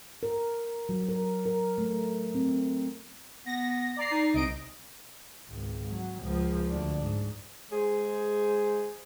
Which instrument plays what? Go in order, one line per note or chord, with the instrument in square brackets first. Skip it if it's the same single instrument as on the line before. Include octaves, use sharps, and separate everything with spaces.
[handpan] A#4
F#3
A#4
A#4
A3
C4
[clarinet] B3 [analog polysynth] A#6
[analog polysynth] D5 A#5 C7
[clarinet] D#4
[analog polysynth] C2 D#5 D7
[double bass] G#1 C#2
F#3
C#2 F3
D2 D4
G#2
[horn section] G#3 G#4 C5